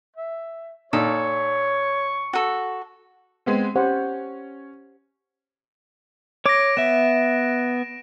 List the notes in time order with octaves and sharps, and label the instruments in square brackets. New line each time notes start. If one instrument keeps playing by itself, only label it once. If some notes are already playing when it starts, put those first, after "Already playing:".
[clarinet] E5
[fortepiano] A#2 D#4 [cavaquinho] A4 [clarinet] C#5 [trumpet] C#6
[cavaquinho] F#4 A4
[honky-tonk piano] G#3 B3 C4
[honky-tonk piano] C#4 [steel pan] G4 C5 F#5
[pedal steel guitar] C#5 D6 [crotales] A#6 D7
[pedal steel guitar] B3 E5 [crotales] E7